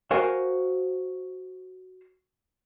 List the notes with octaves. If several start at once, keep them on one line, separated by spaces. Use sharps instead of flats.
F#4 A#4 C5 F5 G#5